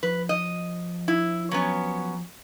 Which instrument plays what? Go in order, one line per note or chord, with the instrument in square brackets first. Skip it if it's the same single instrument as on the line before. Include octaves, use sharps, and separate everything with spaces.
[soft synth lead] F3 [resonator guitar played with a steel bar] B4
[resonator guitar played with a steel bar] D#5
E4
F#3 B3 C#4